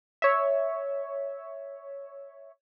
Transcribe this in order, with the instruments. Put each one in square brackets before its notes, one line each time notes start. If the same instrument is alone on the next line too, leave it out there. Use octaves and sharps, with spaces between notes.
[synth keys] C#5 E5